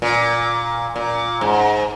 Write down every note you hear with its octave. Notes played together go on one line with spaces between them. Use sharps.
A#2
A#2
G#2